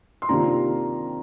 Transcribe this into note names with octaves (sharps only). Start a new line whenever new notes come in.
C6
C3 D#3 A#3 D4 F4 A#5